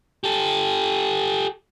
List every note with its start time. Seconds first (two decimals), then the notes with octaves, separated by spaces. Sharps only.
0.24 G4 A4